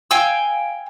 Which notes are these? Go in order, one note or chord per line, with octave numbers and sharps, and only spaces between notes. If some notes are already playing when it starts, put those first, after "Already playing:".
F5 G5 G#5 E6